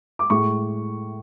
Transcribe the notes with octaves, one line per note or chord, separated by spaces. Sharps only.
D6
A2 G#3 C#6